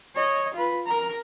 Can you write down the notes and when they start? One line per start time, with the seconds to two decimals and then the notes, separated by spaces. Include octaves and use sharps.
0.15 C#5 D#5
0.54 F4 B4
0.86 A#4 A#5